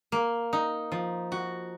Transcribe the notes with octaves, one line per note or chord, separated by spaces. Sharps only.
A#3
D#4
F3
F#4